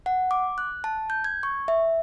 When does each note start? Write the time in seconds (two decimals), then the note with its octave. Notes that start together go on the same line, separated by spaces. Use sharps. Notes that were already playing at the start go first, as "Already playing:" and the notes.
0.06 F#5
0.31 D6
0.58 F#6
0.84 A5
1.10 G6
1.24 G#6
1.43 C#6
1.68 E5